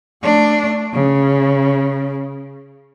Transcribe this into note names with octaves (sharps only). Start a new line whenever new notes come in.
A3 D4
C#3